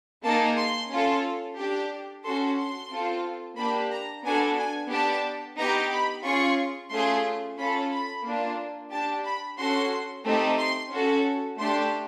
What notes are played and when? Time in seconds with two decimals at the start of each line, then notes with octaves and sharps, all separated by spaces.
0.24 A#3 D#4 G#4 A5
0.57 C6
0.91 C#4 F4 A4
1.57 D4 G4
2.24 C#4 F#4 A4 C6
2.58 C6
2.91 C4 F4 A4
3.58 A#3 D4 G4 B5
3.92 A#5
4.25 B3 D4 F#4 A4 G#5
4.58 G#5
4.91 B3 D4 G4 A5
5.58 B3 D#4 G4 A#5
5.92 B5
6.25 C#4 F4 G#4 C#6
6.92 A3 C#4 F4 G#4 C6
7.58 C#4 F4 A4 B5
7.92 B5
8.26 A#3 D4 F4
8.92 D4 G4 A5
9.25 B5
9.59 C#4 F#4 A4 C6
10.25 A3 C4 D#4 G4
10.59 C6
10.92 C#4 F#4 A4
11.59 A3 D4 G4 C6